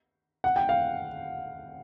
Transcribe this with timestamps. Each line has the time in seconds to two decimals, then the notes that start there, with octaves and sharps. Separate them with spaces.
0.44 F#5
0.56 G5
0.69 F5